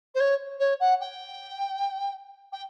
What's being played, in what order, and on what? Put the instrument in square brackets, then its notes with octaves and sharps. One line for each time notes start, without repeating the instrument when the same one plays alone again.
[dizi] C5
C#5
C#5
F#5
G5
G5